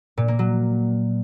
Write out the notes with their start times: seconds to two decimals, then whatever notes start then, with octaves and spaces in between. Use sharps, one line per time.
0.18 A#2
0.28 A#3
0.39 F#3